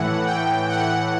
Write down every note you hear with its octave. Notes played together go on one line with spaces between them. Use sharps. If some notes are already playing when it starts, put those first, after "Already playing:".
Already playing: A2 E3 F#5
G5
F#5